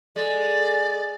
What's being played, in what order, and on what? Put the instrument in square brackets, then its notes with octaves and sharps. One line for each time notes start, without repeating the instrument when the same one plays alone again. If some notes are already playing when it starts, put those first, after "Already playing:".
[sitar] G#3 [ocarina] A4 [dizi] D5